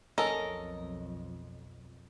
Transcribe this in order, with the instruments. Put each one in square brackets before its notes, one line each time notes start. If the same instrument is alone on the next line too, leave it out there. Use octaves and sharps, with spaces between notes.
[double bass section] B1 F2 [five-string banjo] C#4 A4 A#4 [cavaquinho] D#5 [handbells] A#5